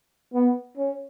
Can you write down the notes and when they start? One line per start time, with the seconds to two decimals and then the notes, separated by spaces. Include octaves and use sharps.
0.34 B3
0.77 C#4